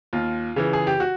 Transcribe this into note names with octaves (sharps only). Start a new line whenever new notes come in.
D#2 F4
C#3 E3
G#4
G4
F#4